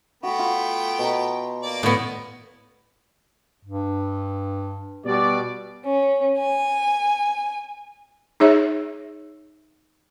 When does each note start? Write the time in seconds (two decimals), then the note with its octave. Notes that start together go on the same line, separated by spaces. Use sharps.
0.23 A3 B3 F#4 B4 G5
0.39 F4
0.99 B2 A#5
1.63 A#3 D5
1.83 A2 B3 C#6
3.65 G2
5.06 B2 G3 D5
5.85 C#4
6.40 G#5
8.40 D#4 G#4 C#5 E5